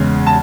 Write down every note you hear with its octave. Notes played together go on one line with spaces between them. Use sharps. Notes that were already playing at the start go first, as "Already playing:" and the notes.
Already playing: E2 C#3 G#3
A5